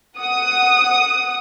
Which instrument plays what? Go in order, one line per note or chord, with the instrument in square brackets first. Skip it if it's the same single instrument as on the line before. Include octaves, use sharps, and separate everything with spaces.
[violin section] F#5 D#6